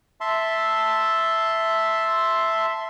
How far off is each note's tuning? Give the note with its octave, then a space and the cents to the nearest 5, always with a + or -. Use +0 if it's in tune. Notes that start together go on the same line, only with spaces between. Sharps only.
E5 +0 A5 +0 C6 +0